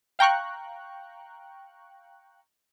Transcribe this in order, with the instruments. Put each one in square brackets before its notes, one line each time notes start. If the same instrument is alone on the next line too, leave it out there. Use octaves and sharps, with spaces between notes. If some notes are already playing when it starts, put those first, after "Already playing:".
[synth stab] F5 G5 A#5 C#6 F#6